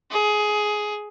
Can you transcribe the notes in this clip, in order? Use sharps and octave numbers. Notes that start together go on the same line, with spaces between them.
G#4